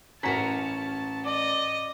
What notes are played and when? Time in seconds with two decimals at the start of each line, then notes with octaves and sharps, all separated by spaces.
0.23 A1 C#4 F#4 A#4 A5 A#5 B6
1.25 D5 D#5